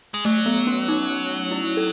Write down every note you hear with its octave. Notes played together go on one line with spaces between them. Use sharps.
G#3
F#3 A3
B3
C#4
D#4
E4
A4